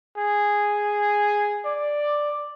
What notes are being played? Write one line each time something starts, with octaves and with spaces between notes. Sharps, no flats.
G#4
D5